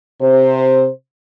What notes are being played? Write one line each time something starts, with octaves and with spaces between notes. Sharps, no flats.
C3 C5